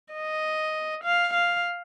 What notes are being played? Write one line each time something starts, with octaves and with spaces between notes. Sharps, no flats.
D#5
F5
F5